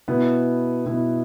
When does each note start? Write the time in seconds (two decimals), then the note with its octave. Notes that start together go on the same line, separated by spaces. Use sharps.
0.08 B2 B3 E4
0.85 B2 B3 E4